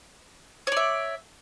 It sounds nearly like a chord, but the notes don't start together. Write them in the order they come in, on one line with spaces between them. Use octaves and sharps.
C#5 D5 E5